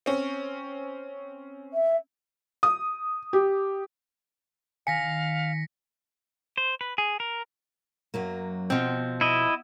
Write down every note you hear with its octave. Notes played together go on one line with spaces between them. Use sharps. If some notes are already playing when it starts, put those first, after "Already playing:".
C4 C#4
E5
D#6
G4
D#3 F5 G#5 A#6 B6 C#7
C5
B4
G#4
A#4
F#2 F#3 A#3
B2 F3 C4
E4 D#5